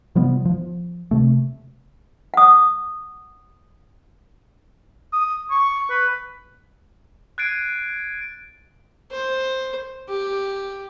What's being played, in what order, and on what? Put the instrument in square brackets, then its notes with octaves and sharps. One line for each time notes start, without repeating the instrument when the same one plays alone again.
[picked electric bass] C3 F3 G3 B3
F3
C3 A3
[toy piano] F#5 D#6
[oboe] D#6
C#6
B4
[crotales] F#6 G#6 A6 C7 D7 D#7
[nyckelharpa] C5
G4